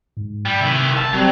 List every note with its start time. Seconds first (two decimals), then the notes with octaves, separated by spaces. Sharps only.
0.17 G#2
0.45 G3
0.61 C3 D#3 E4
0.97 F#1 A5
1.13 E1 F#3 G3 C4